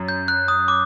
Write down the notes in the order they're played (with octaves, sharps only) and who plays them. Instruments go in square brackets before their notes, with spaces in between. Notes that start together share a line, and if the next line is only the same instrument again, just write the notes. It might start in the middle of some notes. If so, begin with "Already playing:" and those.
Already playing: [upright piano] F#2
[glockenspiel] G6
F#6
D#6
D6